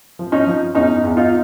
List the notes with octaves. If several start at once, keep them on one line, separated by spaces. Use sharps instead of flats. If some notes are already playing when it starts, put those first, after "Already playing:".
F3
C#4 D#4
F3
E2 C#4 D#4
E2
D#4 F4